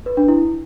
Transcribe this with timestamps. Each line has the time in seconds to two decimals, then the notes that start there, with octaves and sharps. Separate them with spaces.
0.06 B4
0.17 D4
0.28 E4